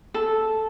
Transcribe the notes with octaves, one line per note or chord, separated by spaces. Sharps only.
A4